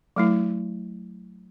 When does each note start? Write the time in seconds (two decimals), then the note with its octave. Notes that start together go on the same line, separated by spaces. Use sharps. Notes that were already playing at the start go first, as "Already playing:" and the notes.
0.16 F#3 A3 E4